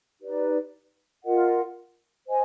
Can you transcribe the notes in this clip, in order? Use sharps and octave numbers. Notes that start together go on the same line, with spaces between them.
D#4 G4 B4 D5
F4 A#4 D#5 F#5
C5 D#5 G#5